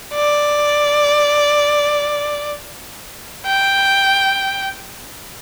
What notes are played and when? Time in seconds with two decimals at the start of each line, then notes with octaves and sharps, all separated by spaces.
0.15 D5
3.47 G5